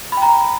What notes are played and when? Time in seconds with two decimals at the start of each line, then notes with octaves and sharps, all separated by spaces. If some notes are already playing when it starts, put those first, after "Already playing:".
0.12 B5
0.17 G5
0.22 A#5